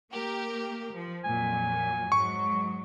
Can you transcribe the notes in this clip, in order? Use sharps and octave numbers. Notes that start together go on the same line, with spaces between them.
A#3 G4 A#4
F3
F2 A#2 F#3 G#5
G#2 F#3 C#6